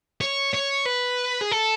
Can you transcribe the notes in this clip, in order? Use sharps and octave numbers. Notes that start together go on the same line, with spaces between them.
C#5
C#5
B4
G#4
A4